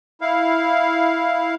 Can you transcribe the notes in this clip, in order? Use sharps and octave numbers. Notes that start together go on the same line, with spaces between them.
E4 F5